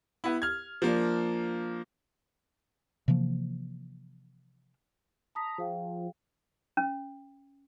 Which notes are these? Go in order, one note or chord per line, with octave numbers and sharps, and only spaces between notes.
B3 E4
F6 G#6
F3 A#3 D4
C3 E3 F3 A#3
A5 A#5 D#6 B6
F3 G#4 F5 G5
C#4